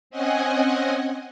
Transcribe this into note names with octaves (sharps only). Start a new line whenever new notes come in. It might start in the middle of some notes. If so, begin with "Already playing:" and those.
C4 C#4 D#5 F#5 G#5